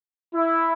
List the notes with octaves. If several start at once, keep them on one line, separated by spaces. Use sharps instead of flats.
E4